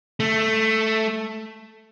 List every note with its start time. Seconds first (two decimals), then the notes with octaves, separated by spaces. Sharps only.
0.20 A3